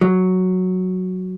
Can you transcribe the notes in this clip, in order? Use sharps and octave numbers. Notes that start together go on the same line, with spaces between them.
F#3